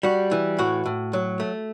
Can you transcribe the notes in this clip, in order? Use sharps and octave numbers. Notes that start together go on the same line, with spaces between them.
G3 F#4
E3
A2 F#4
A2
F#3
A3